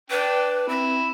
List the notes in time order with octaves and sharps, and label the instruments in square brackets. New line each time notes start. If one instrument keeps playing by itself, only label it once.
[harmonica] D4 G5 [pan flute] B4
[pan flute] C4 [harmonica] E4